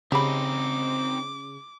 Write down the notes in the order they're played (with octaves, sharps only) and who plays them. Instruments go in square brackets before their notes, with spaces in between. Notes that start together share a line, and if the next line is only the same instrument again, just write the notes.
[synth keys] C#3 [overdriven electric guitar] C4 D#4 [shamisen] G4 B5 [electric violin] D6